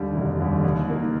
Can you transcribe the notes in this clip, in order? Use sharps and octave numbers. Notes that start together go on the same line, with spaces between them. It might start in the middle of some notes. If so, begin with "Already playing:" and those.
Already playing: D#2 D3 G3
F1
D#2 D3 G3
D#2
D#3 A#3